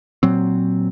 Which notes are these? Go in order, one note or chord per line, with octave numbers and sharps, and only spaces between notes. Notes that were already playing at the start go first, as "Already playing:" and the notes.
A#2 F#3 C4